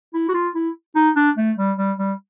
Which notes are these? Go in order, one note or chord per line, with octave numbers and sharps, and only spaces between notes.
E4
F#4
F4
E4
D#4
D4
A3
G3
G3
G3